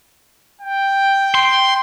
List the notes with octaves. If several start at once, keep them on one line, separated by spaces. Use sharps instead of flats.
G5
C6